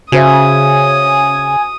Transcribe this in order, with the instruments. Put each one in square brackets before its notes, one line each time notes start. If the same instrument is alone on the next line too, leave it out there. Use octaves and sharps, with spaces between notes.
[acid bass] C#3 [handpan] F#4 C5 E5 [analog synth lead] G#5 [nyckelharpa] D#6